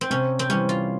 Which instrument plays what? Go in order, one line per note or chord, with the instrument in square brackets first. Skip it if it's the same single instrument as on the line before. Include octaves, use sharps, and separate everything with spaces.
[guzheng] C4
[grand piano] C3 [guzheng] C#4
[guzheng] C4
[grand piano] E3 G3 [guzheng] C#4
[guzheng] F4